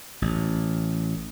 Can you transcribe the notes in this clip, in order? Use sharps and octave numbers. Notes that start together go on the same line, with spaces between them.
A1